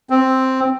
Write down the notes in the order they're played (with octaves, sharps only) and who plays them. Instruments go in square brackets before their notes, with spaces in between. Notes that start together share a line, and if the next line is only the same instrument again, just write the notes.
[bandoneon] C4